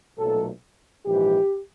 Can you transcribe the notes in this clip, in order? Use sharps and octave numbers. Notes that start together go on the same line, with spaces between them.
B1 A#2 F#3 A3 A4
A#1 G#2 E3 G#3 G4